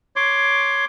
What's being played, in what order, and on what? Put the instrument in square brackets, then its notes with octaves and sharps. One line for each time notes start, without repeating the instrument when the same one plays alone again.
[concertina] C#5 C6 D6